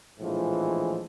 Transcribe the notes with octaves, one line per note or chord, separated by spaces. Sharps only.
A#1 A2 E3 F3 G#3